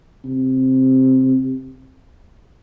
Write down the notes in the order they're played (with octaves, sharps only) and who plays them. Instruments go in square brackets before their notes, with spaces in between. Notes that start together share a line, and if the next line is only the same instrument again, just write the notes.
[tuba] C3